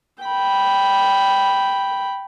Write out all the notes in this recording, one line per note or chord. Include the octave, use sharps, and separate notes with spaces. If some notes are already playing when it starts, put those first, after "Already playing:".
G5 B5